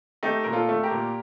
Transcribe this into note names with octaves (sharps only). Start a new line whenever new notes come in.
A3 D#4 G4
A#2 A#4
F4 A4
A3
G4 A#4
A#2